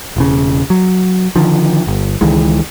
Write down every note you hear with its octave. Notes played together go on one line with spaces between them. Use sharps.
E1 C#3
F#3
D3 D#3 F3
G1
C#2 D#3 E3 G#3